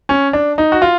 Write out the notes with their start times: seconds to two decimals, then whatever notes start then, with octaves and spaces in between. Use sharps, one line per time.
0.09 C#4
0.33 D4
0.58 D#4
0.72 F#4
0.82 F4